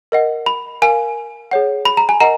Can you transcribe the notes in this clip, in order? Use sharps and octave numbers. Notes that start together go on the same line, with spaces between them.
A#4 D#5 F#5
B5
A#4 F5 G#5
G#4 C#5 F#5
B5
A#5
G#5
A#4 D#5 F#5 A#5